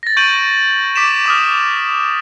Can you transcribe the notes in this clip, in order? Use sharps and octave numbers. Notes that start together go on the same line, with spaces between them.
A6 A#6
C#6 G6 D7 D#7 F#7
D6 B6 D7 E7
D6 D#6 F6